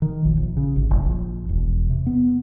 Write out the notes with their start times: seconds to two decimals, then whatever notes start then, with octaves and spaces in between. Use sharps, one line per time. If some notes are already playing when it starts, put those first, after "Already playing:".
0.02 D#3
0.25 A#1
0.37 A#1
0.57 C#3
0.76 G#1
0.90 F#1
1.05 A#1
1.49 E1
1.90 C3
2.06 B3